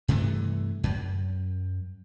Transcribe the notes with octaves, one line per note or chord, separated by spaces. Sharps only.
G2 C3 E3 A3
F#2